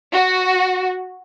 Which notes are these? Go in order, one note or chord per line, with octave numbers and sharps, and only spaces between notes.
F#4